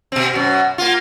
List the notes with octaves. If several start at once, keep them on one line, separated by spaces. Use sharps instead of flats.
B2 C4
F#2 B2
A#3 F4